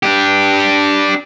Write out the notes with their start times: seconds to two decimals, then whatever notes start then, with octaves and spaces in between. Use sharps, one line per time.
0.03 D4 G4